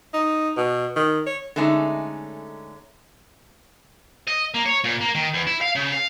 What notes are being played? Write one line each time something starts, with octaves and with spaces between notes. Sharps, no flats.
D#4
B2
D#3
C#5
D3 G#3 A3 C#4 D#4
D#5
A#3
C#5
A#2
A#3
D#3
E2
E4
F5
C#3
F5